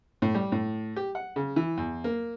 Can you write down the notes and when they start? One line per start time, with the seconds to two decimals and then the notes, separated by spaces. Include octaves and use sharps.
0.22 A2
0.35 G3
0.52 A2
0.96 G4
1.15 F#5
1.36 C#3
1.56 E3
1.78 E2
2.04 A#3